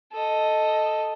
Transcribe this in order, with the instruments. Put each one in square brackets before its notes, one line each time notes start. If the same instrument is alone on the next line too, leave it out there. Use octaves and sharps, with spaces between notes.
[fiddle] A4 D#5